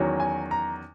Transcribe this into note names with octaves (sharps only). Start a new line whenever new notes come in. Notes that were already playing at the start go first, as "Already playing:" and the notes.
Already playing: E2 D#3 F#3 C#4
G#5
A#5